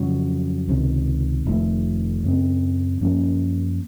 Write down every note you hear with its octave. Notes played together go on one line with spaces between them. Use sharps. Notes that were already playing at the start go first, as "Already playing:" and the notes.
Already playing: F2 C#3 F#3
C#2 C3 D#3
F1 F2 D#3 A3
F#2 C#3 A3 C4
F#2 F3 A#3 C#4